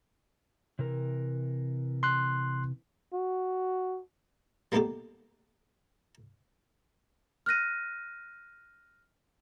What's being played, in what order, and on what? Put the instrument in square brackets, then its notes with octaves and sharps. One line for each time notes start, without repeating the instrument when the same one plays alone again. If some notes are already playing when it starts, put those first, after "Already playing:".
[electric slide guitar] C3 E3 A#4
[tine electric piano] C6 F#6
[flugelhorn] F#4
[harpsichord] G3 A#3 B3 D#4 G4 A4
[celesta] F6 F#6 A#6 D#7